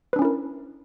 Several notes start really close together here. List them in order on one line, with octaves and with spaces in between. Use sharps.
B4 D4 C#4 E4 A#4